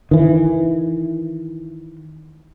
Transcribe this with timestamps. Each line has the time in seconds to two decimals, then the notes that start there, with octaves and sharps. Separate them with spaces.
0.11 D#3 E3